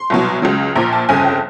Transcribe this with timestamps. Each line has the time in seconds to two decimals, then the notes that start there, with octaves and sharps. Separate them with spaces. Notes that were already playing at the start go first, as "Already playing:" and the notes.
Already playing: C6
0.10 C2 B2 F#3
0.42 C#2 C#3 F#3
0.75 A#1 A#2 F3 A#5
0.93 A5
1.09 G1 F2 C#3 G#5
1.24 G5